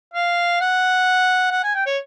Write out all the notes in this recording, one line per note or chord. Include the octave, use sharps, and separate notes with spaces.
F5
F#5
F#5
G#5
G5
C#5